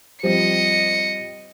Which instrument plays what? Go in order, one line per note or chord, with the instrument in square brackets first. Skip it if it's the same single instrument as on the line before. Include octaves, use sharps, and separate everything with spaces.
[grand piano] F3 G3 C4 [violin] D#5 C#7